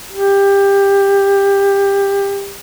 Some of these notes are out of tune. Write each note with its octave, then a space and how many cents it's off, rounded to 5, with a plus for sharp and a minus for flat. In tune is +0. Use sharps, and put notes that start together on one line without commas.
G4 +20